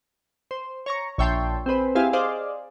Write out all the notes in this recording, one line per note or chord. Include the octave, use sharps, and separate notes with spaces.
C5
C#5 A#5 C#6
A#1 C#5 E5 G5 A5 C6
C4 G#4 B4 C5
C4 E4 G4 G#4 F5 G#5
G#4 C5 D5 D#5 F5